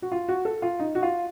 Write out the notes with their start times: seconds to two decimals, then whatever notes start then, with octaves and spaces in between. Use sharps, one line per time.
0.02 F#4
0.12 F4
0.28 F#4
0.45 A4
0.62 F4
0.80 D#4
0.95 F#4
1.03 F4